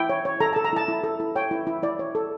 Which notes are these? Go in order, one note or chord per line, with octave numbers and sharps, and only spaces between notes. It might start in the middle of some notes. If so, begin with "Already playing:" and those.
Already playing: E4 G5
C#5
C#5
A4 A#5
A5
A4
A#5
E4 A5
E4
A4
E4
C#5 G5
E4
E4
E4 D5
C#5
A4